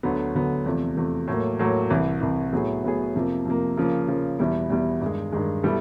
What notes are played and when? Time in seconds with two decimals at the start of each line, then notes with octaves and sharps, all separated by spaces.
0.03 D2 D3 F#3 B3
0.35 D2 D3 F#3 B3
0.66 E2 C3 F3 A3
0.96 E2 C3 F3 A3
1.27 A2 F#3 A#3
1.59 A2 F#3 A#3
1.90 C2 C3 E3
2.21 C2 C3 E3
2.52 A2 F#3 B3 E4 G#4
2.84 A2 F#3 B3 E4 G#4
3.15 F2 C3 F3 A#3
3.45 F2 C3 F3 A#3
3.77 C#3 F3 A#3
4.08 C#3 F3 A#3
4.39 E2 B2 G3 B3 E4
4.70 E2 B2 G3 B3 E4
5.01 G2 D#3 G#3
5.32 G2 D#3 G#3
5.63 B2 G3 B3 E4 A4